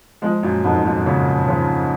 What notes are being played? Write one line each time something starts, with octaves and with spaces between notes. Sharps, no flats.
F3 G#3
F#2 A#2
F2 G#2
F#2 A#2
A#2 C#3
C#3 F3